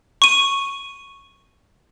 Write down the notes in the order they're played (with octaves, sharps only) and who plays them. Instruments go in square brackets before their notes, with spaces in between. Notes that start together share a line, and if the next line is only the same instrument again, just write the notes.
[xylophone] C#6 D#7